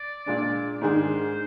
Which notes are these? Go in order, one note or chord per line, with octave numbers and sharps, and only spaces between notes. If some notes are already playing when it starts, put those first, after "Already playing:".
Already playing: D5
A#2 G#3 D4
G#2 D#3 G#3 D4 G#4 C5